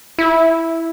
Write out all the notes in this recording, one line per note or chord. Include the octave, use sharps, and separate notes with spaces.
E4